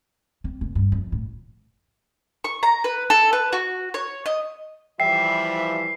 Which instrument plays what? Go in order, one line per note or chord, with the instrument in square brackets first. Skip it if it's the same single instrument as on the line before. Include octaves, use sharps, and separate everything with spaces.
[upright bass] C4
F1
G2
F2
A2
[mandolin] C#6
A#5
B4
A4
B4
F#4
C#5
D#5
[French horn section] E3 F3 G3 [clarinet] E5 [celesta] G5 [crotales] C7